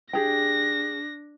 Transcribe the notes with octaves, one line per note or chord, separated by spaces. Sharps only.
D4 G4 G#4 G5 A#6